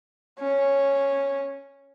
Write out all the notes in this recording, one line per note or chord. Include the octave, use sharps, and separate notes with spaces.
C#4